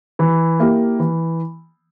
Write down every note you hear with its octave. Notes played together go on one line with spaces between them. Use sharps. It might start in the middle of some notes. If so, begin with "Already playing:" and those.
E3
A#3 E4 G4
E3